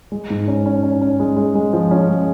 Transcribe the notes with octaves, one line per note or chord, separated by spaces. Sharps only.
G#3
G#2
C#4
C#4
C#4
C#4
G#3
G#3
G#3
F3
C#4
G#3